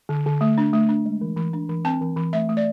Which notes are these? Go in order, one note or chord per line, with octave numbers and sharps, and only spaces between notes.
D3
D3
A3
D4
A3
D4
G#3
E3
E3
D4
E3
C4 A5
E3
E3
A3 E5
A3
D5